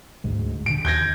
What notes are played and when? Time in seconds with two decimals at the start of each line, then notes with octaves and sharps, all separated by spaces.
0.24 D2 G#2 G#3
0.66 D#1 D3 D7
0.85 D#2 G6 G#6 A#6